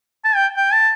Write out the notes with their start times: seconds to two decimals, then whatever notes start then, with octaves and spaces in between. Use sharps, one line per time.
0.24 A5
0.35 G5
0.57 G5
0.73 A5